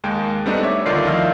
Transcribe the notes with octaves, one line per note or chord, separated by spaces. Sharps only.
D#2 G#3 A#3 G5
G3 A3 B3 C4 D4 D#4
C#5 E5 D6
D2 D3 D#3 F4 D5 C7
D#3 F3 E4 D#5 F5 E6